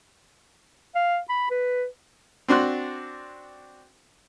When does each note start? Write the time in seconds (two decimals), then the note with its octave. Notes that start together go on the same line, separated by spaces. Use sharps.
0.95 F5
1.29 B5
1.50 B4
2.48 C4 D4 F#4 C6 F#6